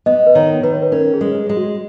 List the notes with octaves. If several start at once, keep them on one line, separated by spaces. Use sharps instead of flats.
B3 D#5
B4
D#3 C#5
D#3 B4
C#5
B4
C#4 A#4
G#4
G#3
G#4
G#3
F#4